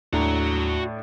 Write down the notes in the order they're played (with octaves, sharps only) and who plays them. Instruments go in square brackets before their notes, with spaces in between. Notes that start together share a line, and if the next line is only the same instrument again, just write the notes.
[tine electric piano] D#2 [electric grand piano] A2 D4 [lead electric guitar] F#4 A#5